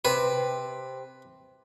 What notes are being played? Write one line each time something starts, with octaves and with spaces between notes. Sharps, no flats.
C3 C4 B4